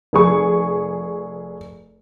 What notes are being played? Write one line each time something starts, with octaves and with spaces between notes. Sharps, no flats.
F1 G#4 C#6